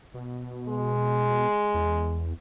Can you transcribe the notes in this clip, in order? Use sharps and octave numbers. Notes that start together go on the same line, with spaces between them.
B2
G#3
E2